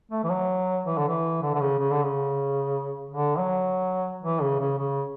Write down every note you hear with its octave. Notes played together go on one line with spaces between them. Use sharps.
A3
E3
F#3
E3
D3
E3
D3
D3
C#3
C#3
D3
C#3
D3
F#3
E3
C#3
C#3
C#3